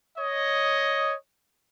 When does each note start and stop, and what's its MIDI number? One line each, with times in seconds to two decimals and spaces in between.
0.18 1.14 73
0.18 1.14 75